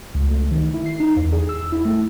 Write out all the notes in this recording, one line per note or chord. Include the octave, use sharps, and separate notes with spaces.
C#2
A3
D#3
E4
C7
D#4
E2
G#4
E6
E4
A3